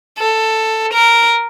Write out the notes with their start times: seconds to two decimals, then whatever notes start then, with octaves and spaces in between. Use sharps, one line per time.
0.18 A4
0.93 A#4